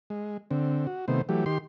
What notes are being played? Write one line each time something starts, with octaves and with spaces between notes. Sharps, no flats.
G#3
D3 C4
F#4
C3 D#3 A3 B3 C5
E3 F#3 A3 G4
D#3 G4 C6